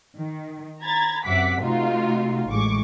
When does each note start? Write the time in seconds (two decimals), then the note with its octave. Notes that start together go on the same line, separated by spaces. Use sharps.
0.17 D#3
0.81 A#5 B5 G#6 A6
1.25 F#2 C3 E5 F#5 D6 B6
1.61 C3 A3 D#4 F4 F#4
2.48 A1 G#3 C#6 D6